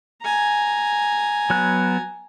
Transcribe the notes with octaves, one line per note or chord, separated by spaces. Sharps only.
G#5 A#5
F#3 B3 F#6